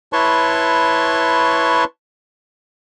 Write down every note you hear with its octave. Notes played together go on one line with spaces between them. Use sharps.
E4 B4 C#5 A5 C6 C#6